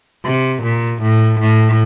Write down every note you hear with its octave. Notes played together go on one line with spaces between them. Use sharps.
C3
A#2
A2
A2